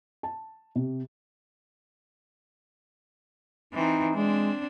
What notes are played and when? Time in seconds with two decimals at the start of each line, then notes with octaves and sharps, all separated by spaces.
0.23 A5
0.75 C3
3.74 E3 C4 D#4
4.16 G#3 C4 D4